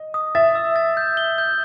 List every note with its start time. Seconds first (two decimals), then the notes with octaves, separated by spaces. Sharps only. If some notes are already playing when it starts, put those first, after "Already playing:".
Already playing: D#5
0.14 D#6
0.35 E5 A6
0.55 E6
0.76 A6
0.97 G6
1.17 G7
1.38 G6